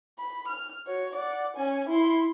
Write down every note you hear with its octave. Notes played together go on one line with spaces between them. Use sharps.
B5
F6
F#4 C#5
D5 F#5
C#4 G#5
E4 C6